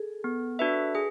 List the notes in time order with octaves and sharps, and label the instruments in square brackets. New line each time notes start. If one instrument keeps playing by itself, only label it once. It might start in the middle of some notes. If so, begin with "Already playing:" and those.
Already playing: [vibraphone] G#4 A4
[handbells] B3
D4 F#4 B4 E5
[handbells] G#4 [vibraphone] B4